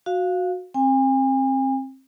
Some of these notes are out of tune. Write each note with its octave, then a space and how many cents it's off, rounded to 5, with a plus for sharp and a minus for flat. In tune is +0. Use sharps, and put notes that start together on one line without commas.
F#4 -15 F5 +0
C4 +25 G#5 -40